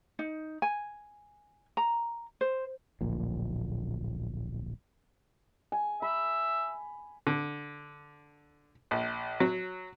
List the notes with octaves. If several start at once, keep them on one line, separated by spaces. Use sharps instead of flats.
D#4
G#5
A#5
C5
D1 A#1 A#2
G#5
E5 B5
D3
A#1
F#3